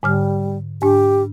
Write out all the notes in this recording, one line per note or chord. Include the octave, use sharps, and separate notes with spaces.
G#2 D3 G3 F6
G#2 D4 G4